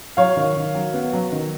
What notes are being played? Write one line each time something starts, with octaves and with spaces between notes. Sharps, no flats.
F#3 C#5 F5
D#3
D#3
F#3
B3
F#3
D#3